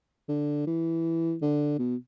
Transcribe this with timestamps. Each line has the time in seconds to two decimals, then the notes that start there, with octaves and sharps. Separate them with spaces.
0.29 D3
0.67 E3
1.42 D3
1.79 B2